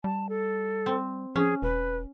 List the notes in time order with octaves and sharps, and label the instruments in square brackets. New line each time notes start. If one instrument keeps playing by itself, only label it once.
[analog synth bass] G3 [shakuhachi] A5
[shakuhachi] A4
[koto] C4
[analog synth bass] F3 [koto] C#4 [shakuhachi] G#4
[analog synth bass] E1 [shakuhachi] B4